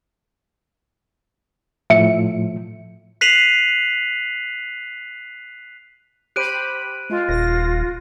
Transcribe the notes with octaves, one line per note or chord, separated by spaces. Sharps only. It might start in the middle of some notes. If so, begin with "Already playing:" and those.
A2 F3 E5 C#7
F#6 B6 C7 D#7 F7 F#7
G4 C5 B5 F#6 D7 D#7
G#3 F4
D#1 A#6